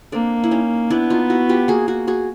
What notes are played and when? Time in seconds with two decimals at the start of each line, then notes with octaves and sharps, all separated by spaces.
0.12 A#3 C4 D4
0.44 E4
0.51 C#4 D#4
0.90 B3 D4 E4
1.10 D#4 F4
1.30 E4 F#4
1.49 F4 G4
1.68 A#3 F#4 G#4
1.88 F#4 G#4
2.07 F#4 G#4